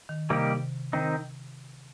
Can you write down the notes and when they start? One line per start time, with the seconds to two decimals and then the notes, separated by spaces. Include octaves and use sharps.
0.09 D#3
0.30 C3 G3 A#3 D#4 G4
0.93 D#3 C4 D#4